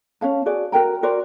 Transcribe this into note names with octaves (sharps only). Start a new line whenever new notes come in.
C#4 C#5 F5 A5
F#4 G#4 D5
F#4 A#4 G5 A#5
F#4 A#4 C5 D5